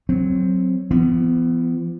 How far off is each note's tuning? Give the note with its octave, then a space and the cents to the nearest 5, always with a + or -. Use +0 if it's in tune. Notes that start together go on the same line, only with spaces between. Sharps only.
F#3 +0 C4 +0
F3 -45 B3 +20